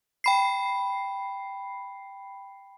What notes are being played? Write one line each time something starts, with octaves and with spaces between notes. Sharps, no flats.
G5 B5 C7